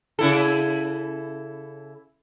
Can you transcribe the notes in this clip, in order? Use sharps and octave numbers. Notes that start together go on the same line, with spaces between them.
C#3 E4 A4